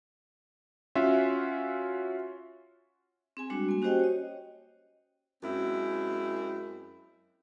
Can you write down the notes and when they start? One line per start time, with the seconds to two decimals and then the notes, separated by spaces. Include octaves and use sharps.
0.95 C#4 F4 F#4 E5
3.37 C4 G#4 G#5
3.50 G3 G#3 D4 F#4
3.69 A#3 G#5
3.82 C#4 F#4 G4 C5 D#5 G5
4.00 C#5 D#5
5.43 F#2 G#3 C4 E4